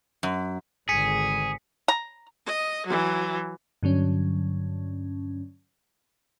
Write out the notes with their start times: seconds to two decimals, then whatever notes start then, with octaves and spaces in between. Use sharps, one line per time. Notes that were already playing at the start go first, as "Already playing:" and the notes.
0.23 F#2
0.89 G#1 D3 G#4 G#5 B6 C#7
1.88 A#5
2.46 D#5
2.86 E3 F#3
3.83 G2 D3 F#3 C#4